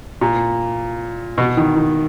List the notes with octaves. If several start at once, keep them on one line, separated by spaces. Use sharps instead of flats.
A#2
B2
D#3
D#3